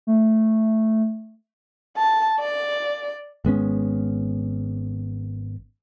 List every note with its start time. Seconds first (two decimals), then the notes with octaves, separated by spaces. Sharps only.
0.07 A3
1.97 A5
2.40 D5
3.45 G#1 G#3 B3 C#4